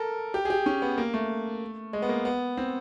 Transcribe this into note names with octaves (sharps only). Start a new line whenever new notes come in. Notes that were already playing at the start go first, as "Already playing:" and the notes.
Already playing: A4 A#4
G4
G#4
G4
C#4
B3
A#3
A3
G#3
B3
A#3
B3
C4